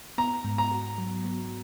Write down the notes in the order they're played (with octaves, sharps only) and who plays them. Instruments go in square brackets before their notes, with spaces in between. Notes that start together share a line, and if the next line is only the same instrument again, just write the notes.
[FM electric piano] B3 [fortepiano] A#5
[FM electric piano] G#2
[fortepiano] A#5
[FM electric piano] F#4
F#3
B3